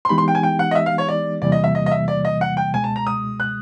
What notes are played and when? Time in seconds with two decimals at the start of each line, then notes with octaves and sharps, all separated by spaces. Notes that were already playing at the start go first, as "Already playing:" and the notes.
0.05 C6
0.09 E3 G#3 B3 D#4 G4 B5
0.18 C6
0.28 G5
0.35 G#5
0.43 G5
0.59 F#5
0.71 D#5
0.75 E5
0.86 F5
0.98 C#5
1.09 D5
1.42 E2 C3 E3 G3 A#3 D5
1.52 D#5
1.64 E5
1.75 D#5
1.86 D#5
1.91 E5
2.08 D5
2.25 D#5
2.41 F#5
2.57 G5
2.73 C#2 B2 G#3 G#5
2.84 A5
2.96 A#5
3.07 D#6
3.40 F#6